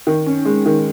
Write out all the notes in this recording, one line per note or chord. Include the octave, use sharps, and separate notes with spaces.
D#3
C#4
G#3
D#3